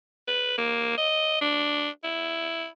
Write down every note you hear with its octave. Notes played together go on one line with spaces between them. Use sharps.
B4
A#3
D#5
D4
E4